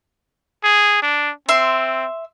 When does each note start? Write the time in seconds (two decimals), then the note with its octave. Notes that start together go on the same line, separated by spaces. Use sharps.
0.64 G#4
1.03 D4
1.49 C4 E5 C6